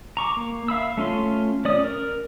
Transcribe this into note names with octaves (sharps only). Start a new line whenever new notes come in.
A#5 C#6 D6
A#3
E5 F5 B5 E6
A3 C#4 F4 C6
C#4 D5 D#6
A#4